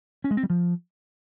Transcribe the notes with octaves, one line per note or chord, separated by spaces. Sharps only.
C#4
G#3
C4
G3
F3